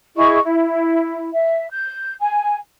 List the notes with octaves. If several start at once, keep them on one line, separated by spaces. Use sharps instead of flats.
E4 G#4 D#5 C#6
E4
E5
G6
G#5